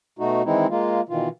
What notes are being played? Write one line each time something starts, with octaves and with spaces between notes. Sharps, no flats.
B2 A3 D#4 F#4
D#3 E3 G#3 C4 D#4 E4
G#3 A#3 F4
B2 D#3 E3 F4